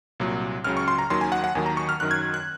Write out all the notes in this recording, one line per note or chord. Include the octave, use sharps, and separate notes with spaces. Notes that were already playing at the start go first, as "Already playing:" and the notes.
C2 A#2 F#3
C#2 C#3 F#3 F6
C#6
C6
A#5
D#2 D#3 F#3 C6
G#5
F#5
F#5
D#2 D#3 F#3 G#5
A#5
C#6
F6
F#2 D#3 F#3 F#6
G#6
F#6